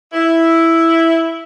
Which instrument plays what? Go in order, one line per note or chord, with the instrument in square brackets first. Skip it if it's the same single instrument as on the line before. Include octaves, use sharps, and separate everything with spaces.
[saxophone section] E4